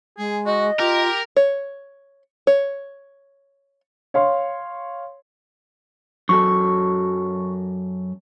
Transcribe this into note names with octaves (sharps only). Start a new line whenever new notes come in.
G#3 G#4
F#4 D#5
F4 G4 A#4
C#5
C#5
C#5 F5 C6
F#2 F#3 A4 C#6